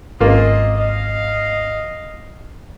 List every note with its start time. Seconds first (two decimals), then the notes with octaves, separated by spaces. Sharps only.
0.20 G#1 C#3 A#3 C4 F4 D#5
0.76 D#5 F5